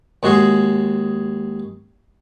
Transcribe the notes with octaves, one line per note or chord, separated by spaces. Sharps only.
D#2 G#3 F#4 G#4 C6